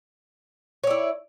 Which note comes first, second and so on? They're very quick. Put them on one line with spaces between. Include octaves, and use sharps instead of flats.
C#5 D5 E4